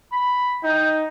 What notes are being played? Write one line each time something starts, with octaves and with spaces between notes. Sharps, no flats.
B5
D#4 G5